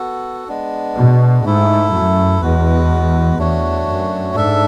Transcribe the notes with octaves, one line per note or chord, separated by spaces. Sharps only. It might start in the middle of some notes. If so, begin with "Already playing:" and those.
Already playing: B3 F#4 A4
G#3 B3 D4
B2
G#2 A3 E4 A4
F#2
E2 G#3 B3 F#4 B4
E2 A3 D4 F#4 C#5
F#2
G#2 D4 A4 E5